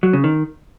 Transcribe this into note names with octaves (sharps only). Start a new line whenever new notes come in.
F#3
C#3
D#3